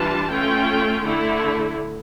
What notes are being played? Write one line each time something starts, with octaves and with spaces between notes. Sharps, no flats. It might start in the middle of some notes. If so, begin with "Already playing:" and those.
Already playing: E3 G3 D4 F4 A5
A3 C#4 F4 G5
D3 A3 E4